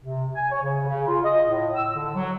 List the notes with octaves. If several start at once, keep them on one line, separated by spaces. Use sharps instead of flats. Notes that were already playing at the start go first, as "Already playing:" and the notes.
C3
G#5
C#5
C#3
C#3
F4
D#5
A2
E6
D3
F#3